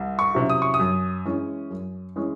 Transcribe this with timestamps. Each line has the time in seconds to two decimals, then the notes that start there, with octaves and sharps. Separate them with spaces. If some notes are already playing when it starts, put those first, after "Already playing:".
Already playing: C2
0.19 C#6
0.34 C3 F#3 C#4 E4
0.49 D#6
0.62 C#6
0.74 D#6
0.80 F#2
1.25 E3 G#3 C#4
1.71 F#2
2.16 E3 G#3 C#4